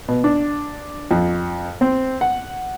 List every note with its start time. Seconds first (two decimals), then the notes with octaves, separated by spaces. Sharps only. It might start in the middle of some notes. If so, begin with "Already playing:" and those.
0.08 B2
0.24 D4
1.11 F2
1.81 C4
2.21 F#5